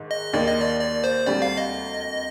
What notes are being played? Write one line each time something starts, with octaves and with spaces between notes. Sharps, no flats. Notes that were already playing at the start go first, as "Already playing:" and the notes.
Already playing: G#2 D#3
D#5
D#2 D#3 A#3 D#4 D5
D#5
D5
D5
C5
D2 C3 G3 D5
F5
D#5